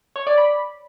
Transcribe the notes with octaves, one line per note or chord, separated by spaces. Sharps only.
C#5
D5
B5